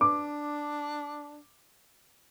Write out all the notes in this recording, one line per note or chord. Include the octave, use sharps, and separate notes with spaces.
D4 D6